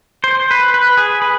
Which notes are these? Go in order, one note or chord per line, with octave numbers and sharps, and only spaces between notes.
C5
B4
B4
G#4
B4